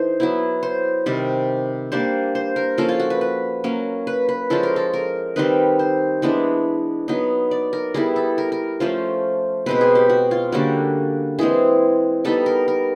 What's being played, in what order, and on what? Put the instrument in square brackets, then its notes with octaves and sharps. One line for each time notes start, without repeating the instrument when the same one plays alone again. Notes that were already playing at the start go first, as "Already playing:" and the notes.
Already playing: [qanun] E3 D#4 A4 C5
F#3 B3 E4
C5
C3 D#3 G3
G3 A#3 D4 C5
C5
A#4
F3 A#3 C#4 F4 A4
F4
F#4
B4
B4
F#3 A#3 C#4
B4
B4
F3 G#3 C#4 F4 A4
A#4
A4
A#4
D#3 G3 C4 D#4 B4
C5
E3 G#3 B3 D4
F#3 B3 D#4
D5
A#4
G3 B3 E4 G#4
A4
A#4
A#4
F3 A3 C#4 F4 C5
B2 G#3 C4 B4
G#4
G4
F#4
F4
D3 G3 A#3 C#4 F#4
E3 G#3 C4 G#4
G3 B3 D#4 A4
A#4
A#4